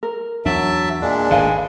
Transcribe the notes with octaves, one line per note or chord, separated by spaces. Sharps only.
A#4
E2 F#3 D4 E5 A5
A#2 G#3 D4
G#1 G#2 D3 B4 F5 G#5